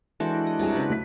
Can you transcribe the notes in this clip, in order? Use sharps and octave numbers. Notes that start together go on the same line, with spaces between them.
E3 G#3 D4 F#4 A4 C5
E4
D#5
C2 C3 F#3 G#4
C#3 B4
D2 A3 B6